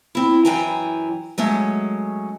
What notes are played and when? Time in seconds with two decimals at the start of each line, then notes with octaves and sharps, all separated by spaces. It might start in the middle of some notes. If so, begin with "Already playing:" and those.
0.15 C4 E4
0.45 F#2 E3 G5 G#5 A#5
1.38 F#3 G#3 A3 C#4